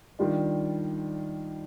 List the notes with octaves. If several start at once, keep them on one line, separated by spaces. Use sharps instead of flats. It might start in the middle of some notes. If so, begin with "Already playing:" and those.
D#3 G3 D4 F4